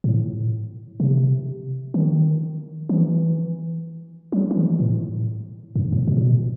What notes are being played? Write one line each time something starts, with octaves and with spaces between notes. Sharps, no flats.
A2
C3
D#3
E3
F#3
F#3
E3
A2
G2
A2
B2
A2
B2